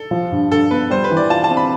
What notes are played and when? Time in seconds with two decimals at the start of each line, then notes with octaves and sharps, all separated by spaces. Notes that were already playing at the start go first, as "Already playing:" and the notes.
Already playing: A4
0.11 F3
0.32 G2
0.51 G2 A4
0.71 B3 B4
0.90 G3 C5
1.04 B4
1.11 E3
1.17 D5
1.30 F4 A5
1.44 A5
1.50 C4
1.57 B5